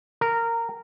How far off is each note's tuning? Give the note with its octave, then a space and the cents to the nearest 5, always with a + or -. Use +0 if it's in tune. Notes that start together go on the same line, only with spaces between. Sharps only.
A#4 -15